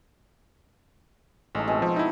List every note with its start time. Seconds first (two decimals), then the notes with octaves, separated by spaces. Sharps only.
1.55 A1 G#3 A3 D#4
1.68 B2 G#3 C4
1.82 F3
1.96 D#4 E4 E5 F#5